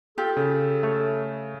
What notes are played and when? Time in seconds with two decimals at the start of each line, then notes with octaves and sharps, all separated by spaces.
0.18 F4 G4 A4
0.37 C#3
0.83 A3 C#5